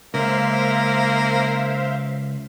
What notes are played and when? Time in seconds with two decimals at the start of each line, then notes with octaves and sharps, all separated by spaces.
0.14 C#2 A#3 C5 E5 F5